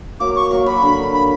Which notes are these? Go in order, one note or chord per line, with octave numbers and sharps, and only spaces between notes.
F#3 A#3 D6
C#6
F#3 A#3
F#3 B5
D3
B5